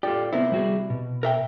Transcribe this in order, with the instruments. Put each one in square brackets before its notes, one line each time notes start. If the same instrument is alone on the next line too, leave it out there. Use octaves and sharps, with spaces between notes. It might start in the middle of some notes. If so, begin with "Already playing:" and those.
[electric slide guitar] F4 A4 D5 [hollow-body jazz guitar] G4
[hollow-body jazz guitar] C3 E4 [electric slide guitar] B3 A#4 C5
[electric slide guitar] G3 F#4 G#4
B2
[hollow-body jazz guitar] A#4 E5 G5